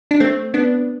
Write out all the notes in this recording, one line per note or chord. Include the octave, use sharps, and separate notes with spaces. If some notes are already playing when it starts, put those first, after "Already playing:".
D4
A3 C4
B3 D4